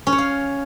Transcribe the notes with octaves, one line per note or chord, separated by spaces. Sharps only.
C#4
C#5
F5